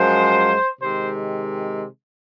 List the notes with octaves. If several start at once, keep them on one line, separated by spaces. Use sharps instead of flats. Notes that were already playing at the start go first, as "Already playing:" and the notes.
Already playing: F#2 F3 G#3 C5
C3 D#3 G#3 C5